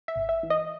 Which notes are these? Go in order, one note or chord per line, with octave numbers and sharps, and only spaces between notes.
E5
G#1
E5
E3
D#5